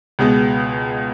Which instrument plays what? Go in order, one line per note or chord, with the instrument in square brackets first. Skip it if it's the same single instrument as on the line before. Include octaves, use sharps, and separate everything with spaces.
[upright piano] C#2 B2 G#3 B3